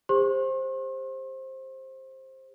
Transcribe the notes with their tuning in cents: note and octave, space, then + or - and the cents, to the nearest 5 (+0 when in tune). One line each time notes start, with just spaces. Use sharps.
G4 +45 C5 +10 C6 +45